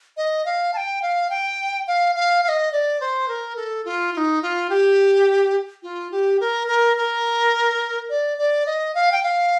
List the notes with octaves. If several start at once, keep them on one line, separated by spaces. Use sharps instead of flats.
D#5
F5
A5
G5
F5
G5
F5
F5
F5
D#5
D5
C5
A#4
A4
F4
F4
D#4
F4
G4
F4
G4
A#4
A#4
A#4
D5
D5
D#5
F5
G5
F5